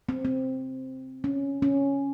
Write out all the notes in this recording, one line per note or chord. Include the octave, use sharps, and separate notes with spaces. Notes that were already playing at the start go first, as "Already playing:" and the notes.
C4
C4
C#4
C#4